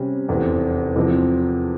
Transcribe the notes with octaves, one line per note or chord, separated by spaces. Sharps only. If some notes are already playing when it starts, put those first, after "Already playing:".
Already playing: C3 G3 C#4
F1 E2 C3
E2 C3 F3 C4